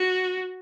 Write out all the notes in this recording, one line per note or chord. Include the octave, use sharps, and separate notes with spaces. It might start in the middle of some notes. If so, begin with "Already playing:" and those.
Already playing: F#4